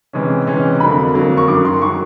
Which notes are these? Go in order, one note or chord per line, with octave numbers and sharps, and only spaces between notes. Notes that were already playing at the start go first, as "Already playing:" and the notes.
C3 E3 G#3 C#4
C3 E3 G#3 C#4
F2 D3 F#3 A#3 B5
F2 D3 F#3 A#3
C#6
F#2 D#3 F#3 D6
C6
D#3 F#3 C#6